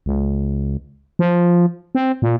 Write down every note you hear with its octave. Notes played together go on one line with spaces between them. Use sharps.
C#2
F3
C4
A#2